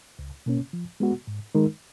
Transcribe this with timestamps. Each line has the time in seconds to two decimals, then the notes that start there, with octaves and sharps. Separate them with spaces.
0.19 C#2
0.46 B2 A#3 C#4
0.73 F3
1.00 G#3 B3 F#4
1.27 G#2
1.55 D#3 G#3 D#4 A#4